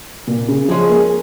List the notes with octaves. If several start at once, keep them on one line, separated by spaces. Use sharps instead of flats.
A#2
C#3
F3 G#3 C#4 G#4 C#5
A#3